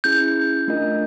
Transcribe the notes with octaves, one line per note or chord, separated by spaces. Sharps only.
C#4 E4 G#4 G6
A3 D4 F4 A#4 D#5